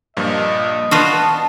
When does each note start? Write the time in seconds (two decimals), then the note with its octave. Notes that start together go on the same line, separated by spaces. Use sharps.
0.17 G2 A#2 F3 D#5
0.91 B3 D4 F4 F#4 A5